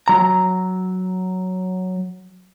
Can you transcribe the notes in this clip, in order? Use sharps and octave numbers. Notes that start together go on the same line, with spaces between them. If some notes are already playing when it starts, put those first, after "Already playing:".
F#3 A#5